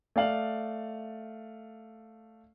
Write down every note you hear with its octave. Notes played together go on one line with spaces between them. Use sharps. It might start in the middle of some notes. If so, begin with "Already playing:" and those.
A3 D5 F5 F#7